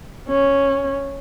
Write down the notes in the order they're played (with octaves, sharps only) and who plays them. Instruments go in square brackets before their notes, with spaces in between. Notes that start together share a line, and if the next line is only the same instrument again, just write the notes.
[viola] C#4